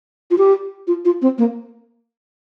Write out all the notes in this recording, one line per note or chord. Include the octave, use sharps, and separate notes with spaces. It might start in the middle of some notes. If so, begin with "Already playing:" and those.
F4
G4
F4
F4
C4
A#3